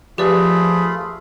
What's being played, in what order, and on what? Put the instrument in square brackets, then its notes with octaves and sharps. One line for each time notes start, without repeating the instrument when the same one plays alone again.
[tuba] F3 [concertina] A3 F4 B5 [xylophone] G4 B4 D5 [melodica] G#4